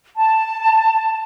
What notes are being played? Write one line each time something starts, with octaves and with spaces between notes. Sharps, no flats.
A5